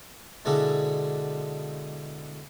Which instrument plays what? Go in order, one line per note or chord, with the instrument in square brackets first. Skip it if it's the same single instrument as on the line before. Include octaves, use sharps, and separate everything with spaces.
[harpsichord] B2 D3 G#3 D4 E4